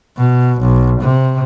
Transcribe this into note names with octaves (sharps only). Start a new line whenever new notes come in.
B2
B1
C3